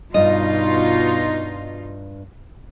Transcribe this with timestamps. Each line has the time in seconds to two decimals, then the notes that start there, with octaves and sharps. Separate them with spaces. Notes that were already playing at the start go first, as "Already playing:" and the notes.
0.14 G2 B2 D#4 F4 D#5